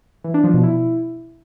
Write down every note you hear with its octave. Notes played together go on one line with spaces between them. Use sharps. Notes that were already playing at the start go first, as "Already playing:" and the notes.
E3
D4
F3
B2
E4